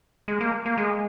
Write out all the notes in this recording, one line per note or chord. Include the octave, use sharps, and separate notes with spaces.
G#3
A#3
A#3
G#3